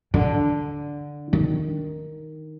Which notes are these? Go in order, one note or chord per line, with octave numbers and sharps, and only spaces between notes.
D3
D#3